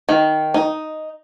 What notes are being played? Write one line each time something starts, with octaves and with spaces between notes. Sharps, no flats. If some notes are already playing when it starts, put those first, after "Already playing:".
D#3
D#4